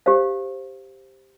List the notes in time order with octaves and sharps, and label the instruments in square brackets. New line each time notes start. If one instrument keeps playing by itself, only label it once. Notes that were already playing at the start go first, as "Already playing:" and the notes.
[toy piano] G4 C5 F5